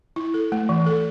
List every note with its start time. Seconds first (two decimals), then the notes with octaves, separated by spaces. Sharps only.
0.16 E4
0.34 A4
0.52 A3
0.69 E3
0.86 A4